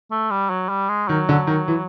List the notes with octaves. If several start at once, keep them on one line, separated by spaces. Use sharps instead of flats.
A3
G3
F#3
G3
G#3
D#3 F#3
D3
D#3
E3